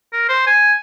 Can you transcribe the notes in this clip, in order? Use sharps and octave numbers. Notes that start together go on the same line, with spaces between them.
A#4
C5
G#5